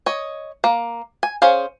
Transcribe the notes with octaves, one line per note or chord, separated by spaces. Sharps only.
C#5 D#5
A#3
G#5
C#4 G#4 C5 F5